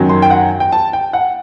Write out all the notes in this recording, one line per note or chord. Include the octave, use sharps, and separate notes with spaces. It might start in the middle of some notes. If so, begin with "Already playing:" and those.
Already playing: F#2 D#3 F#3
C6
G5
F#5
G5
A5
G5
F#5